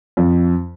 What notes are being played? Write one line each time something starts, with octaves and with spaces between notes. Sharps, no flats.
F2